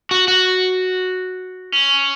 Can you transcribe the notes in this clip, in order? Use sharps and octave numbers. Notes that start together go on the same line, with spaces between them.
F#4
F#4
C#4